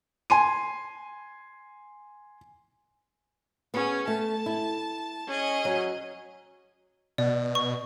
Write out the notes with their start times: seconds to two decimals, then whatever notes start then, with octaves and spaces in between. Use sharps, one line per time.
0.30 G#5 C6 D#7
3.74 B3 C#4 G#4
4.07 A3 A5
4.46 E4
5.27 C#4 G#4 D#5
5.65 F#3
7.18 B2 D5
7.55 C#6